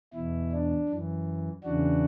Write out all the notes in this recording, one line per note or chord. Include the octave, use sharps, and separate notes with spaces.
E2 B2 E4
D4
F#2 E3
E2 C#3 E3 D4 F#4